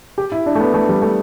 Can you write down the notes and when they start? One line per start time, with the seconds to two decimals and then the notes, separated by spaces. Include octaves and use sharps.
0.18 G4
0.32 E4
0.46 D4
0.55 A3
0.61 B3
0.74 A3
0.89 G3
1.02 A3